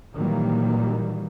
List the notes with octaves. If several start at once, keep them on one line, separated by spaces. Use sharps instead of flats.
A#2 D#3 E3 F#3 G3 A#3